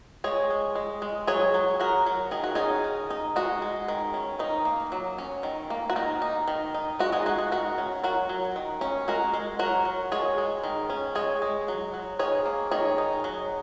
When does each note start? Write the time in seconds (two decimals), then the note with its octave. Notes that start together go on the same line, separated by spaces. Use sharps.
0.24 G#3 G#4 C#5
0.50 G#3
0.75 G#3
1.02 G#3
1.27 F#3 G#4 C#5
1.54 F#3
1.80 F#3 F#4 A#4
2.06 F#3
2.31 D#3 G#4
2.44 F#4
2.55 C#4 D#4 G#4
2.84 D#3
3.10 D#4
3.36 G#3 F#4
3.62 G#3
3.88 D#3
4.14 C#4
4.39 D#3 D#4
4.65 A#3
4.92 F#3
5.18 C#4
5.43 D#3
5.70 A#3
5.90 F#4
5.96 D#3 D#4
6.22 D#4
6.48 D#3
6.74 D#4
6.99 G#3 F#4
7.12 D#4 G#4
7.26 G#3 F#4
7.38 F#4
7.52 D#3 F#4
7.78 C#4
8.03 F#3 F#4 A#4
8.29 F#3
8.56 D#3
8.81 C#4
9.08 G#3 F#4 A#4
9.34 G#3
9.59 F#3 F#4 A#4
9.85 F#3
10.12 G#3 G#4 C#5
10.38 G#3
10.64 D#3
10.90 C#4
11.15 G#3 G#4 C#5
11.42 G#3
11.68 F#3
11.94 F#3
12.19 D#3 G#4 C#5
12.45 A#3
12.71 D#3 G#4 C#5
12.98 D#4
13.24 F#3